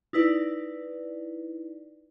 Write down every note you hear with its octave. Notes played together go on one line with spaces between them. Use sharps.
D#4 E4 B4 D5